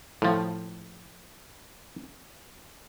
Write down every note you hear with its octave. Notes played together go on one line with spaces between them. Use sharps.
A2 F3